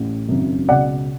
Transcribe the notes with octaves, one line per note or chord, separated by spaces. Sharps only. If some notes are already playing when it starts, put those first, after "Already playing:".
Already playing: A1 A2
G#1 F#2 C#3
C#2 B2 D5 F#5